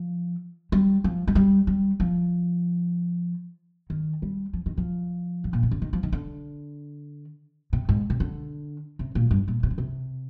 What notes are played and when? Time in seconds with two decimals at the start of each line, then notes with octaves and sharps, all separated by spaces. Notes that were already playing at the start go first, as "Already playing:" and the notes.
Already playing: F3
0.72 G3
1.04 F3
1.27 G#3
1.35 G3
1.67 G3
2.00 F3
3.90 D#3
4.22 G3
4.53 F3
4.66 D#3
4.77 F3
5.44 G#2
5.53 A#2
5.63 C3
5.71 D3
5.82 D#3
5.93 F3
6.03 D#3
6.12 D3
7.73 C3
7.89 G#2
8.10 C3
8.20 D3
8.99 C3
9.15 A#2
9.31 G2
9.48 A#2
9.63 C3
9.70 D3
9.78 C3